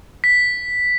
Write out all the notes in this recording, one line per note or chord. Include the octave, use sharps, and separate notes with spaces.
B6